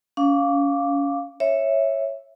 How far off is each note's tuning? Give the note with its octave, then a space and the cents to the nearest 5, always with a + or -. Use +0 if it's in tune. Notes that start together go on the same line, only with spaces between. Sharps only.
C#4 +25 F5 +0 D6 +0
C#5 -10 E5 +0